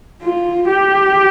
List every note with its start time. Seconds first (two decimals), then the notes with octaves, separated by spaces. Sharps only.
0.22 F4
0.68 G4